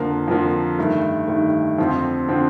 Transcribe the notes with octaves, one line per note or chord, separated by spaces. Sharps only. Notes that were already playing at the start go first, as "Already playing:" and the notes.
Already playing: F2 D3 F3 A#3
F2 D3 F3 A#3
G2 D#3 A3
G2 D#3 A3
F2 D3 F3 C4
D3 F3 C4